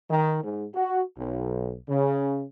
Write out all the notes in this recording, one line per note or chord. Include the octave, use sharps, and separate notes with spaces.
D#3
G#2
F#4
B1
C#3